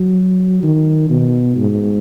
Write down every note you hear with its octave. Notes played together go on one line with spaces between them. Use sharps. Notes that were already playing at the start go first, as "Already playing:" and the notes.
Already playing: F#3
D#3
B2
G#2